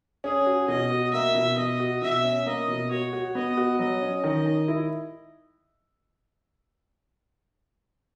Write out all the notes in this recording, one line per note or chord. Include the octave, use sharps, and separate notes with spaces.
C#4 G#4
F#4
B2 D#5
F#4
A#3 E5
B2
B2 D#5
F#4
B2 E5
C#4
A#3 D#5
B2
F#4 C#5
F#4
B3 D#5
F#4
F#3 D#5
C#4
D#3 D#5
D#3
E4